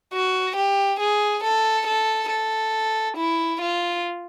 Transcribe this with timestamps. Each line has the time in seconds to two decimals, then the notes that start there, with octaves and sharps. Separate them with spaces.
0.13 F#4
0.56 G4
1.00 G#4
1.43 A4
1.87 A4
2.30 A4
3.17 E4
3.61 F4